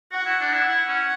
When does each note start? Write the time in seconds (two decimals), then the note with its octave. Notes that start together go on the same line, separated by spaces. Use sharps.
0.12 F#4 F#5
0.26 E4
0.41 D4
0.54 E4
0.68 E4 F#5
0.87 C#4